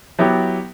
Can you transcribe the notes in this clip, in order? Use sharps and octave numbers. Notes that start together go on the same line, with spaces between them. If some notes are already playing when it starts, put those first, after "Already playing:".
F#3 B3 E4 G4